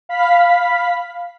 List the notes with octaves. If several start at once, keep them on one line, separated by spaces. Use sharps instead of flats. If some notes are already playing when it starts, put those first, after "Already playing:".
F5 B5 B6